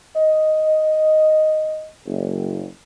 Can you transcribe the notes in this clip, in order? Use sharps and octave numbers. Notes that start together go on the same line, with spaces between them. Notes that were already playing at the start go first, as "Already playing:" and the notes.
D#5
F#1